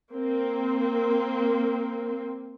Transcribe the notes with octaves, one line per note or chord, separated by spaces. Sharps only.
A#3 C4